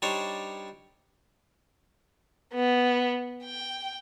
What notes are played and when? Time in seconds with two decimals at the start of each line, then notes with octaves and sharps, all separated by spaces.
0.02 G3 D4 D#4 C5 C#5
2.54 B3
3.44 G5